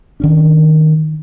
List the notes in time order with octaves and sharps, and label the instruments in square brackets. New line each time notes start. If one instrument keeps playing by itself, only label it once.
[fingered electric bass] D#3 C#4 D4